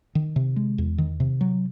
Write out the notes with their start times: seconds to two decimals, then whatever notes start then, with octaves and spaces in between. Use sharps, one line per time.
0.15 D#3
0.36 C3
0.56 G#3
0.78 E2
0.98 D#3
1.20 C3
1.41 F#3